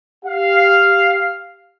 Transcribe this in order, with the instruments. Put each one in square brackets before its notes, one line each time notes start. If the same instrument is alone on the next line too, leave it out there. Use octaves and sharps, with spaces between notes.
[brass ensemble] G4 F5